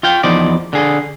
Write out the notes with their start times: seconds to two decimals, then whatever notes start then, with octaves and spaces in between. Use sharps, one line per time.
0.03 F4 F5 G5
0.23 E2 F3 D#4 D5
0.73 D3 G#4